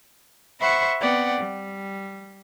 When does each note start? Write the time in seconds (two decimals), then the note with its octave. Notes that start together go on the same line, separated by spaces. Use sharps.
0.60 C5 E5 F#5 B5 C#6
1.00 B3 C4 D5 F#5 G5
1.40 G3